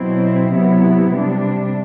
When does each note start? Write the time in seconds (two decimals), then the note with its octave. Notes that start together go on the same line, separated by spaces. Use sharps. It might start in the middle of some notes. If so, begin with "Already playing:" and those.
Already playing: B2 F#3 C4 E4
0.51 C3 F#3 B3 E4
1.11 C3 G3 D4